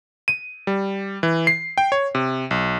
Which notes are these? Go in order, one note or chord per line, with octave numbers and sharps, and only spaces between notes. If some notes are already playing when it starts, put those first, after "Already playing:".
D#7
G3
E3
C7
G5
C#5
C3
B1